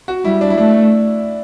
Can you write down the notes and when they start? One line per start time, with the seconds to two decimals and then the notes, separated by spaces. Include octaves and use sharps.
0.08 F#4
0.24 G3 E4
0.41 D4
0.50 E4
0.57 A3 D4